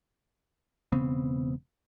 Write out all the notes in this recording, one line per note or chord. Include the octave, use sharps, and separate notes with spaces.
E1 C#3 B3 C4